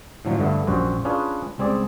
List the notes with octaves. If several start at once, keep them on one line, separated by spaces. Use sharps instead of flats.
A2 D3 F3 F#3
G1 G2 D3 A3 B3
A#1 F#2 G3 F#4 C5
C#4 D4 F4 G#4 B4
C#2 G3 C4 G#4 D5